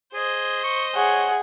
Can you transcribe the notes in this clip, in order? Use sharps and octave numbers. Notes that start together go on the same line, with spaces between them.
G#4 C5 D#5
C#6
G#4 C#5 F#5